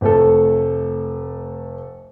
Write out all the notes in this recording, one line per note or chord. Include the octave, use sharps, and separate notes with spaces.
F1 A3 A4